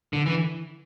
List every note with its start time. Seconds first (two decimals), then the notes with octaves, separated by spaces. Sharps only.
0.13 D3
0.26 E3